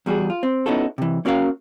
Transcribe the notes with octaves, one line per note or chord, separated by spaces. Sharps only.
E2 G3 F#4 G#4
F4
C4
B3 C#4 D#4 E4 F#4 A4
C3 E3
A#3 C#4 F#4 A#4 E5 F5